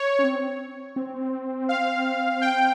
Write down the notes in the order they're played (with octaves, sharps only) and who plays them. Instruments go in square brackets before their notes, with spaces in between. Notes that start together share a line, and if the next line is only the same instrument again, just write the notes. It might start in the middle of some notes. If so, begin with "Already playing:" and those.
Already playing: [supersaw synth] C#5
[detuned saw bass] C#4
C4
C4
[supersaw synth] F5
G5